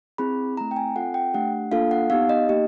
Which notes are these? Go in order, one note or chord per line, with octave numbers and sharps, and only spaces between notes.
C4 E4 G#4 B5
A3 C4 E4 A#5
G5
G#5
C4 F4 A4 F#5
G5
A3 D4 G4 F#5
A#3 D4 F4 A4 F5
F#5
B3 D#4 G4 F5
D#5
A#3 D#4 G4 D#5